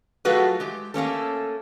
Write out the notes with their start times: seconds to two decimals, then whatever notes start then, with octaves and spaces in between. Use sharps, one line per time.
0.25 F#3 A3 F4 F#4 G#4 B4
0.60 G#3 G4
0.94 A3 A#3 C#4 A4